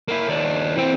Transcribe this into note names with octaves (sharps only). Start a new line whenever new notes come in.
A#3 E4
D#2 D4
E3 C4